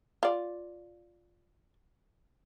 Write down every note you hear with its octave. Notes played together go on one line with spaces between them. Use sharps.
F4 D5